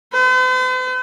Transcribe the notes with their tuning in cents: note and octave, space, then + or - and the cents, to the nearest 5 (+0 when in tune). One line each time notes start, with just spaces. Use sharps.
C5 -45